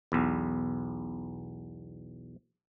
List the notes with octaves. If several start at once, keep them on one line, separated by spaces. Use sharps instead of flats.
B1 E2